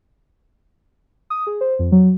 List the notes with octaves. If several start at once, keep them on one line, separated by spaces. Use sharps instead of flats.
D#6
G#4
C5
F2
F#3